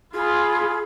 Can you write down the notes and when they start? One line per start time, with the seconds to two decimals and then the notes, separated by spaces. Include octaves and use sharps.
0.14 F4 G#4 B5